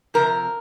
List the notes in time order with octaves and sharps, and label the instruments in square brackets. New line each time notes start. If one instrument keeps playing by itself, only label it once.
[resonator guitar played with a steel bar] F2 C3 F3 A#4